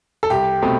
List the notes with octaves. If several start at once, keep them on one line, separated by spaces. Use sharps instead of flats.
A4
C2 G4
B2 A3 C4